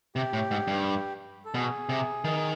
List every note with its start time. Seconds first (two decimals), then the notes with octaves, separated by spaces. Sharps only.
0.16 C3 G4
0.33 A2
0.51 G#2
0.67 G2
1.45 A4
1.54 B2 G#4
1.89 C3
2.24 D#3